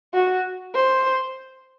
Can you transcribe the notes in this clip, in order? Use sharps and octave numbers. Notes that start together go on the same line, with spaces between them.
F#4
C5